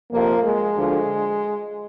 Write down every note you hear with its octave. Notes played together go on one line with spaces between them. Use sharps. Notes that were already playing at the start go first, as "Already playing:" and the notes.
F2 C3 F3 A#3
G#3
D2 D3 F3